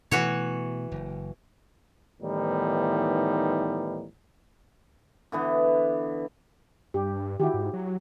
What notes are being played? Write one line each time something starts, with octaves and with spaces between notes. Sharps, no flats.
B2 E3 A3 F#4 C#5
F#1
A2 D#3 E3 G3 B3 D#4
D3 E3 B3
G2 G4
D#3 E4 F#4 G4
G#2
F#3